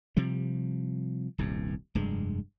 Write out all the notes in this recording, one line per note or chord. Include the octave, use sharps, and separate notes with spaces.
C3 F3 G3
D#1 C2 G2
F1 G2 G#3